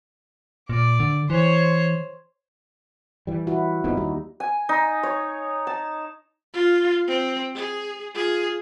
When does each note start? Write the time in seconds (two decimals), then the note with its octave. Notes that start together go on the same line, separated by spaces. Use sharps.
0.69 A#2 D5
1.00 D3
1.30 E3 C5 C#5
3.27 E3 G3
3.47 E4 F#4
3.84 G1 F2 B2 D#4
3.97 D#2 G3
4.40 G#5
4.69 D#4
5.03 C#5
5.67 A5
6.54 F4
7.08 C4
7.55 G#4
8.15 F4 G#4